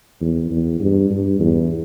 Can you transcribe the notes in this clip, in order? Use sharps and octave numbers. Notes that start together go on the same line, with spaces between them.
E2
E2
G2
G2
E2